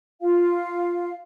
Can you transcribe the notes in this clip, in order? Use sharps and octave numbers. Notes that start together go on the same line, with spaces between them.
F4 F5